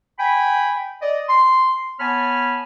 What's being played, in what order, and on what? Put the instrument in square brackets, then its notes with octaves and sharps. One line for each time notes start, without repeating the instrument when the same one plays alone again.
[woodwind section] G5 G#5 B5
D5 D#5
C6
B3 C#5 G#5 A5 B5 F6